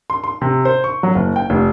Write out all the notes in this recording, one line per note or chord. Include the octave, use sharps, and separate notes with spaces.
C6
C6
C3
C5
C#6
F#3
F#1
G5
F1